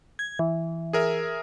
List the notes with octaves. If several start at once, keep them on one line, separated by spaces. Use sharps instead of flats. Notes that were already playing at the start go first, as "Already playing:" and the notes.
G#6
E3
G#4 A#4 E5